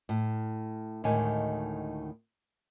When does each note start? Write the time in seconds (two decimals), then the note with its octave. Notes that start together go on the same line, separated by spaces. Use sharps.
0.09 A2
1.04 D2 A2 D#3 G#3 G#5